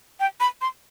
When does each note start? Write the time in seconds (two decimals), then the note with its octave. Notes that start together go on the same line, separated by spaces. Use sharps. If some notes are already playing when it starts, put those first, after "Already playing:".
0.20 G5
0.40 B5
0.61 C6